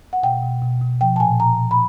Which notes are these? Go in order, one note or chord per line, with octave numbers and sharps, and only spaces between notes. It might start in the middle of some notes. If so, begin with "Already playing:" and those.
F#5
B2 G5
B2
B2
B2
F3 G5
A5
A#2 G#5
A#2 A#5
F3
B5